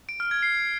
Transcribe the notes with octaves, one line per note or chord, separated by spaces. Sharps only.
D7
F6
G#6
C7